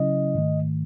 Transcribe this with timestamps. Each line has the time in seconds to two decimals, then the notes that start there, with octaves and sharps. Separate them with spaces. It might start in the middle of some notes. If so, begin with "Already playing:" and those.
Already playing: C#3 F#3 C#4 E4 D#5
0.35 G#2 D#3 A3